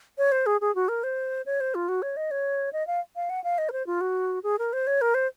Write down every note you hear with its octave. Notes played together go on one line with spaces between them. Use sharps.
C#5
C5
G#4
G#4
F#4
A#4
C5
C#5
C5
F4
F#4
C#5
D#5
C#5
D#5
F5
F5
F#5
F5
D#5
A#4
C5
F4
F#4
G#4
A#4
C5
C#5
A#4
C5